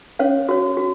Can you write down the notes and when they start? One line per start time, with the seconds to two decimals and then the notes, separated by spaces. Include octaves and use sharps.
0.19 C#4 C#5 F5
0.49 F#4 C#5
0.77 F#4